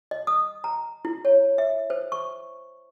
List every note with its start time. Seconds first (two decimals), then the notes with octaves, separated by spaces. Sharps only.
0.11 D#5
0.27 D#6
0.64 A#5
1.05 E4
1.25 C#5
1.58 E5
1.90 C5
2.12 C#6